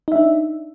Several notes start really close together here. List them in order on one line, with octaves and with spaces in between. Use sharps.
D#4 E5 D4